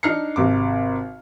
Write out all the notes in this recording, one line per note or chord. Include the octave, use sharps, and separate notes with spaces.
D4 D#4 F6 C7 C#7
G#1 C3 D6